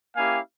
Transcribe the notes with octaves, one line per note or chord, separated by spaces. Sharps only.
A#3 C#4 E4 G4 F5 G#5